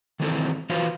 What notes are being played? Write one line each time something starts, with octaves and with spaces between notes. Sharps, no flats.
D#3 E3 G#3 C4 E4 A4
E3 F4 F#4 B4 C5 F5